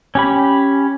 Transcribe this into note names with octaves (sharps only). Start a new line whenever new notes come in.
C#4 G4 B5